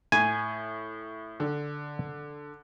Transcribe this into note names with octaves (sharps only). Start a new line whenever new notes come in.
A2 G#5
D3